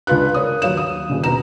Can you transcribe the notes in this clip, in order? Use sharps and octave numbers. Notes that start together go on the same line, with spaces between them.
C#2 D4 F4 B4 F#6
A#4 C#5 D5 D#6
D#2 F#3 C#5 F5 E7
D#6
D#1 C#3
B2 A#5 E7